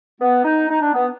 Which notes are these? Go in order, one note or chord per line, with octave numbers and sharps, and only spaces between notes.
B3
D#4
D#4
D4
B3